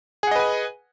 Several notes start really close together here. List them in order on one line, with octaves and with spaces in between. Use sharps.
G#4 F#5 D#5 B4 G#5